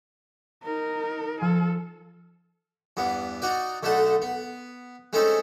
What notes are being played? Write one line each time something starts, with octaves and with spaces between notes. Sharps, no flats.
D#4 A#4
F3 A4 F6
E2 G2 B3
D#4 F#4 D5
B1 D3 A3 D#4 F#5 A5
B3
G#3 A3 C4 C#4 D#4 A4